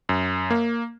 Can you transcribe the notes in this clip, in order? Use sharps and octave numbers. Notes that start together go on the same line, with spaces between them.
F#2
A#3